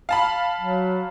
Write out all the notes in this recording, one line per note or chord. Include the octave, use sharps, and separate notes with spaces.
F5 A5 B5
F#3